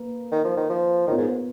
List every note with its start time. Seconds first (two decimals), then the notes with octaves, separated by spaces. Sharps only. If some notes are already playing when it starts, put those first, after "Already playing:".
Already playing: A#3 B4
0.31 D#3
0.44 F3
0.57 D#3
0.70 F3
1.08 D#3 B3 F4 A#4 C#5
1.17 G#2